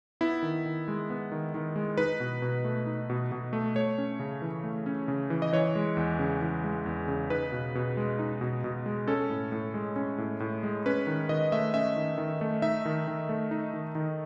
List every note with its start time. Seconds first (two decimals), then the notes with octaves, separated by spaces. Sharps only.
0.21 B3 E4
0.42 D#3
0.66 D#3
0.88 G#3
1.10 B3
1.32 D#3
1.54 D#3
1.76 G#3
1.97 D#4 B4
2.20 B2
2.42 B2
2.64 A3
2.86 D#4
3.10 B2
3.32 B2
3.53 A3
3.75 A3 C#5
3.98 C#4
4.20 C#3
4.42 E3
4.64 A3
4.86 C#4
5.08 C#3
5.30 E3
5.42 D#5
5.53 E3 C#5
5.76 G#3
5.97 E2
6.19 C#3
6.41 E3
6.64 G#3
6.86 E2
7.08 C#3
7.30 D#4 B4
7.52 B2
7.75 B2
7.97 G#3
8.19 D#4
8.41 B2
8.64 B2
8.86 G#3
9.08 C#4 A4
9.30 A2
9.52 A2
9.74 G#3
9.96 C#4
10.18 A2
10.40 A2
10.63 G#3
10.86 C#4 B4
11.07 D#3
11.29 D#3 D#5
11.52 A3 E5
11.74 C#4 E5
11.96 D#3
12.18 D#3
12.41 A3
12.62 D#4 E5
12.85 D#3
13.08 D#3
13.29 A3
13.51 D#4
13.73 D#3
13.95 D#3